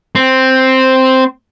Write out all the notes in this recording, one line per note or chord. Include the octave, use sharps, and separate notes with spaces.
C4